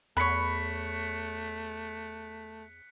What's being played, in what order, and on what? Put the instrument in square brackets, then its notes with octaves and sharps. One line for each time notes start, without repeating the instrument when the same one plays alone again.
[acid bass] E2 [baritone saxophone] A3 [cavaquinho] C#5 B5 [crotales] F#6 B6 C#7